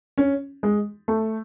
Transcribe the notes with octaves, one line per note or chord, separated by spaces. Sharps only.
C#4
G#3
A3